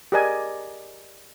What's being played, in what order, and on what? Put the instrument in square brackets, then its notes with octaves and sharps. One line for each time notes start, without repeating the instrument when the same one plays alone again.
[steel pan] G4 G#4 A#4 D5 D#5 G#5